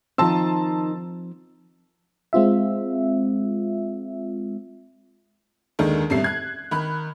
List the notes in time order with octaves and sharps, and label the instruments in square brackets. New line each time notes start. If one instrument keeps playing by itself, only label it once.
[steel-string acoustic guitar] D#3 D#4 [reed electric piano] F3 C4 [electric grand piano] A5 C6 E6
[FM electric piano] G#3 C4 F4 E5
[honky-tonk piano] D#2 D3 D#3 G#3 D4
A1 F2 B2 G3 E5 C7
F#6 G#6
D#3 B5 F#6